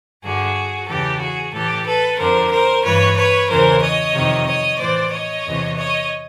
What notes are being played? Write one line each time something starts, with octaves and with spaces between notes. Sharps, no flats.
G2 D3 F#4 G#4
E2 C#3 E3 G4 A4
F#4 G#4
A2 E3 G4 A4
A4 B4
F2 D3 A#4 C5
A#4 C5
G2 E3 B4 C#5
B4 C#5
E2 C#3 E3 A#4 C5
C#5 D#5
F2 C3 D#3
C#5 D#5
A2 E3 C5 D5
C#5 D#5
E2 C3 E3
C#5 D#5